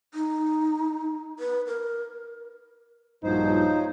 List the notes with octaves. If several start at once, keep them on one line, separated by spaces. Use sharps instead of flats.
D#4
B4
A#4
A#1 G2 F3 F#3 D#4 C5